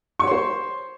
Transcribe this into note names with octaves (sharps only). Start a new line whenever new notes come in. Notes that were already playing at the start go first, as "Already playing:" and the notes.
C5 C#5 C6 C#6